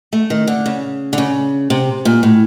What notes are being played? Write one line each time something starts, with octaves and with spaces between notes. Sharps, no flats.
A3
D#3
D3
C#3
D3
C#3
C3
A#2
A2